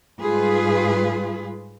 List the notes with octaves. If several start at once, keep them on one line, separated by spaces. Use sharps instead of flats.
G#2 G3 F4 G#4 B4